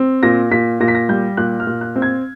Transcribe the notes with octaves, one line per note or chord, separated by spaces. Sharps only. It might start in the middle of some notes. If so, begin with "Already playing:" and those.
Already playing: C4
A#2 A#6
A#2 B6
A#2 A#6
B6
A#6
G3 G6
A#2 F#6
F6
A#2
F#6
C4
G#6